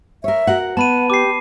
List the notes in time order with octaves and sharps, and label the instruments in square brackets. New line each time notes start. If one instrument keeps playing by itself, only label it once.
[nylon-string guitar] A#4 C#5 [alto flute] E5
[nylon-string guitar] F#4 A#4 F#5
[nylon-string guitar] B3 [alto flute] F#5 [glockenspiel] A5 B5 D#7
[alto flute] G4 [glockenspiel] D6 C7